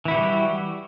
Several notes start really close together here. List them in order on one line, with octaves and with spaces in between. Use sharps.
E3 E4 F#4 G4 G3